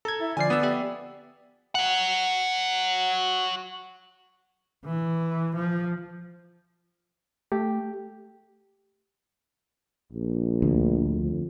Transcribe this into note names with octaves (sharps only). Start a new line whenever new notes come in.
A4 A#5 G#6
E4
D3 F3 D5 G#5 C7
B3 D#6 E6
G4 E5
C#5 F#5
E3
F3
A3 G4
A#1
D2
F2